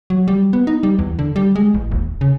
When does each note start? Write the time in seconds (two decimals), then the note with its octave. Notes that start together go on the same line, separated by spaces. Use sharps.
0.10 F#3
0.28 G3
0.53 B3
0.67 D#4
0.83 G3
0.99 E2
1.19 D3
1.36 G3
1.56 G#3
1.74 A1
1.91 D#1
2.21 C#3